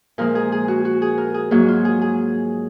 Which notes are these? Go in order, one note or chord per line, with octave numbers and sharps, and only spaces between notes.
A#2 F3 G#3 A#4
G#4
G#4
F#4
F#4
G#4
A#4
G#4
G#2 F#3 A#3 F#4
F4
G#4
G#4